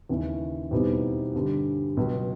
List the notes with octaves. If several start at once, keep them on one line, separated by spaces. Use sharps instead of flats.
D#2 C#3 E3
E2 B2 G3 C4 D#4
G2 D3 G3
C#2 B2 F#3